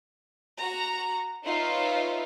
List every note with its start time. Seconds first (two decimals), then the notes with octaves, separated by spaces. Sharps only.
0.59 F#4 A#5
1.44 D#4 F4 B4 C#5 E5